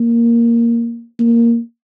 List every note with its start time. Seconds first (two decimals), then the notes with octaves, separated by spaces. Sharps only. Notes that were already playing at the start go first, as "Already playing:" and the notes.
Already playing: A#3
1.19 A#3